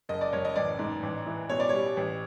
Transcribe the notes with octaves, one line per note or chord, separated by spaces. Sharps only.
F#1 D#5
D5
F#1 C#5
D#5
A1 D5
G#2
A1
E3
B2 C#5
D5
G3 C#5
A1